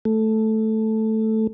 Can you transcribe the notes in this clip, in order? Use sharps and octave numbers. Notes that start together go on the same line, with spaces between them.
A3